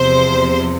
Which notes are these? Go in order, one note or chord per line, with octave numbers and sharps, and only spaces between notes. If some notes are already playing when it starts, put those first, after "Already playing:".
Already playing: E2 C3 F3 C5